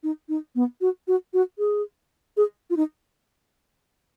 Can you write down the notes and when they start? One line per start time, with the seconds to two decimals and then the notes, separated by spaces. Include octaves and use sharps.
0.03 D#4
0.29 D#4
0.55 B3
0.81 F#4
1.08 F#4
1.33 F#4
1.59 G#4
2.37 G#4
2.70 F4
2.77 D#4